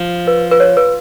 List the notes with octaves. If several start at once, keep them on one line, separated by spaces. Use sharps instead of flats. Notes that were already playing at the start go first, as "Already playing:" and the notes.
Already playing: F3
B4
B4
C#5
B4